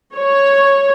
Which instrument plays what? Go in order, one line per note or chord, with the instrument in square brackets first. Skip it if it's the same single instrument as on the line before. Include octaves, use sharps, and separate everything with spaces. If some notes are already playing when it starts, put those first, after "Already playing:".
[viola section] C#5